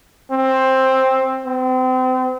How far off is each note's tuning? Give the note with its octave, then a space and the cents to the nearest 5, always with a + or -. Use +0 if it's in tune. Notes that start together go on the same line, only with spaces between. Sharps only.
C4 +10
C4 -35